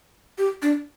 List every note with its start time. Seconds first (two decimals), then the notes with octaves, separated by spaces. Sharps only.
0.38 G4
0.62 D4